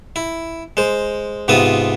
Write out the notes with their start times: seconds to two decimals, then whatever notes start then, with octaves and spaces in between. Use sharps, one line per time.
0.16 E4
0.77 G#3 C5
1.48 G#2 C3 B3 F4 E5 D#6